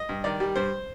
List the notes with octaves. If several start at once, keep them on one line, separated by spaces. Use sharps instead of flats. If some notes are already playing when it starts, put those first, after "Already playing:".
Already playing: D#5
G2
D#3 D5
G3
G2 C5